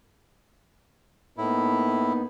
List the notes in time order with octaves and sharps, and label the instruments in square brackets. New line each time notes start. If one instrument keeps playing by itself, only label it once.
[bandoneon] A2 E4 [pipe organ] A#3 B3 D#4